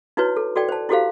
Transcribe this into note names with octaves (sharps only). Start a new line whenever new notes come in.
D#4 E4 F#4 B4 C#5
A4
F#4 A4 D5 G5
C5 A5
E4 F#4 G4 A4 C5 F5